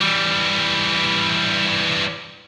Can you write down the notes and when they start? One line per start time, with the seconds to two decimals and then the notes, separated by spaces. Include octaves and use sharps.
0.01 E3 G3